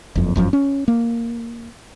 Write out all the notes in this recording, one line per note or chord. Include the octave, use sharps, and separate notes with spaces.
F#1 F2
G1 F#2 A#2 F3
C#4
A#3